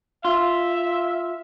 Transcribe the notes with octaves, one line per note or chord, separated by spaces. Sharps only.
F4 E5